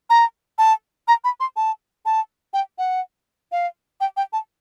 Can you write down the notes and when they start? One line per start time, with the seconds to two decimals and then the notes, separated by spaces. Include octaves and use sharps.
0.10 A#5
0.58 A5
1.08 A#5
1.24 B5
1.40 C6
1.56 A5
2.06 A5
2.53 G5
2.78 F#5
3.52 F5
4.01 G5
4.17 G5
4.33 A5